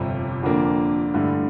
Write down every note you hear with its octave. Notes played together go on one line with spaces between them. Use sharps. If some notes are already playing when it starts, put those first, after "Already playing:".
Already playing: G1 F2 C3 G3
F2 D3 F3 A#3 D4
G2 D3 A3 E4